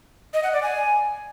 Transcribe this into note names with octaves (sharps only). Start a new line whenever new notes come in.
D#5
F#5
D5
G#5